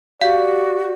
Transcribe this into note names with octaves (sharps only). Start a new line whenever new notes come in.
F#4 G4 D5 F5